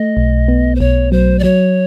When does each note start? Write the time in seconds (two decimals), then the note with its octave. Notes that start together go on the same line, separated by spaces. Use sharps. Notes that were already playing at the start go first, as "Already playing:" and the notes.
Already playing: A3 D#5
0.17 B1
0.48 B3
0.75 C5
0.80 B1 C#5
1.12 F#3 C5
1.39 D5
1.44 F#3 C#5